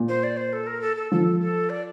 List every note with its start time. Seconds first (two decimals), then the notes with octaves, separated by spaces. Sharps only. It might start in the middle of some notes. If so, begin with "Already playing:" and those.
Already playing: A#2
0.09 C5
0.23 D5
0.37 C5
0.53 A4
0.67 A#4
0.81 A4
0.96 A4
1.12 F3 A4
1.40 A4
1.70 D5